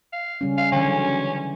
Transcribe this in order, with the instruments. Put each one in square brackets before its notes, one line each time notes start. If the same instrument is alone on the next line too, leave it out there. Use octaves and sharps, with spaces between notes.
[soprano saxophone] F5
[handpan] C#3 G3 C#4
[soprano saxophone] F5
[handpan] D3 E3 [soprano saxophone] C#4
[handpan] F#3